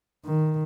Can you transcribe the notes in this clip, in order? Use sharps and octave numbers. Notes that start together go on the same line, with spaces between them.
D#3